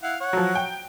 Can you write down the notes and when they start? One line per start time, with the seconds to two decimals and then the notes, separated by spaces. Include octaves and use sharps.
0.03 E4 F5 F#5
0.20 C#5 F#5
0.33 F3 F#3
0.55 G5